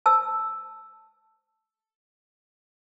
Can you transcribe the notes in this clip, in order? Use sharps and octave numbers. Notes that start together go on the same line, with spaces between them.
A5 E6